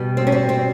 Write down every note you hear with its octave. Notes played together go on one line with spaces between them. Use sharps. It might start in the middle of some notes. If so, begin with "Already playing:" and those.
Already playing: B2 G3
C4
C#4
C4
C4